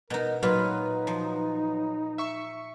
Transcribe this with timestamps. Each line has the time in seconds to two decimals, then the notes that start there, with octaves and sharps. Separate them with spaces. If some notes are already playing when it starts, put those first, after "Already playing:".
0.10 B2 D#4 A#4
0.43 A#2 F#3 D#4 F4 B4
1.07 F3
2.18 E5 C#6